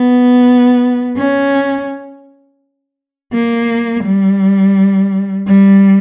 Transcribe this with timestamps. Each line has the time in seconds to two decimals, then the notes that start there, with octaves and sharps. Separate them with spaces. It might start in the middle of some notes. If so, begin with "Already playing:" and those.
Already playing: B3
1.17 C#4
3.33 A#3
4.04 G3
5.47 G3